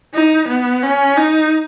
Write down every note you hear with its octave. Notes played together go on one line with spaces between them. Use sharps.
D#4
B3
C#4
D#4